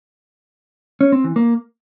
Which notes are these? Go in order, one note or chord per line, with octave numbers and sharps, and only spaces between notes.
C#4
C4
E3
A#3